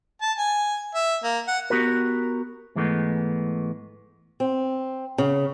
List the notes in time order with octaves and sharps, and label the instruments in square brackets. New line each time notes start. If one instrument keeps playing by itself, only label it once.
[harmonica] A5
G#5
E5
A#3
F#5
[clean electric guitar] B3 F#4 G4 A#4
G#2 E3 G#3 A3 B3
[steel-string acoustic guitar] C4
C#3